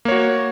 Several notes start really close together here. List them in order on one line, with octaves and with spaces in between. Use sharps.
A#3 C#5 F#4